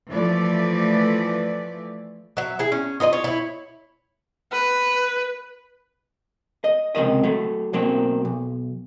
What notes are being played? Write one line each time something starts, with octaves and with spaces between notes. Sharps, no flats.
E3 F3 A3 B4 D5
F#3 E5
E4 G#4
C#4
D#4 F4 B4 D#5
F4 C#5
E4 C#5
B4
D#5
C#2 C3 D#3 A#4 D#5
F#3 A3
B1 F#3 A#3 C4
B1